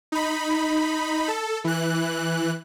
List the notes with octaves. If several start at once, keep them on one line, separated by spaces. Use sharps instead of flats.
D#4 B5
A4
E3 F#6